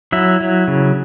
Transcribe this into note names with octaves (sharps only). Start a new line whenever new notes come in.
F#3 E4 E5
F#3
C#3